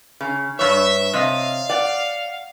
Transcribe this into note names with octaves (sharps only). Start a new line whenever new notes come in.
C#3
G2 C#5 E5
C3 D#5 F5
D5 F#5